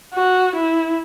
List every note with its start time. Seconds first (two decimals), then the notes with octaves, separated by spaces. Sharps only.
0.14 F#4
0.56 E4